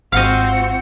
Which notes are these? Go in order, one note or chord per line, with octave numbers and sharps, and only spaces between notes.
G#1 G#2 C4 F4 F#4 D#5 F5 F#5